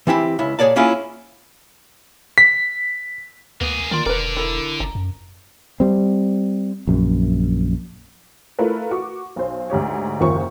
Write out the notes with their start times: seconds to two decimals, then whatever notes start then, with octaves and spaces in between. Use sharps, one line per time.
0.07 E3 C4 E4 G4
0.39 C#2 E4
0.59 A#2 G#4 C#5 D5 A5
0.76 A#3 C#4 E4 F4 G#4
2.38 B6
3.61 D2 A#3 B3 G#4
3.91 D#3 A#3 D4 F4
4.06 E1 D3 A#4 B4 D5
4.37 E4 A4 A#4
4.80 G1 A#5
4.95 F#2
5.80 G3 C4
6.87 A#1 F#2
8.59 A3 E4 F4 A#4 B4
8.91 F#4 C#6 D6
9.36 B1 C5
9.70 D2 G#2 G4 C#5
10.20 F#1 D#2 D#3 F3 C5 C#6